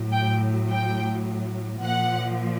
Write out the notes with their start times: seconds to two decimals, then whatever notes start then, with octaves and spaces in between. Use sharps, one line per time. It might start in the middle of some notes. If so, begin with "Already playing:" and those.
Already playing: A2 F#3
0.12 G5
0.69 G5
1.82 A#2 F3 F#5